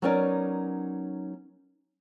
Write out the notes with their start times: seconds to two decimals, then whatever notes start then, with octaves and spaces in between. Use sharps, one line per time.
0.02 F#3 B3 C#4 D#4 A#4 D5